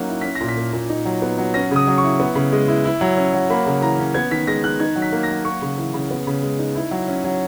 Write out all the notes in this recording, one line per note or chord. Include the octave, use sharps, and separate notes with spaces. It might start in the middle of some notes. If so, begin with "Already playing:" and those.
Already playing: F#3 A#3 C#4 D#4 F#6
E4
C#4 B6
A#6
A#2
B6
A#3
A#2
D#4
F#3
B3
F#3
C#4 A#6
C#3 D#6
F#3
C#6
E4
B3
C#3
G#3
E4
E4
F#3
C#4
F#3
A#3 B5
C#3
E3 A#5
C#4
B3 G#6
D#3 B6
G#3 A#6
D#3 F#6
D#4 G#6
F#3
B6
A#3
A#6
F#3
A#3 C#6
C#3
E3
C#3
B3
C#3
G#3
D#4
E4
F#3
C#4
F#3